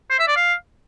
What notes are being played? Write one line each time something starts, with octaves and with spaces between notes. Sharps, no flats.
C5
E5
D5
F5